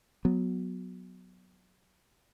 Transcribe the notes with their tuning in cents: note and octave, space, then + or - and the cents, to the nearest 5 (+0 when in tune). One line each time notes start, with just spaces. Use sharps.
F#3 -10 B3 +0